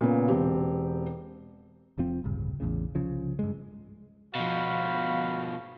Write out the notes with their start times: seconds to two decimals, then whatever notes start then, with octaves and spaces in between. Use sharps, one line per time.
0.01 A#2 C#3 B3
0.28 E1 C4 G4
1.98 F1 F2 F3 C4
2.24 D1 A#1 G2 C#3
2.60 A1 E2 A2 C#3
2.95 C2 C#3 F3
3.39 G2 G#3
4.35 B2 F3 F#4 F5 B5